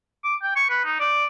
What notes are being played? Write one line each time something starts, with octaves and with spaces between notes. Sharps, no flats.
D6
G5
C#6
B4
D#4
D5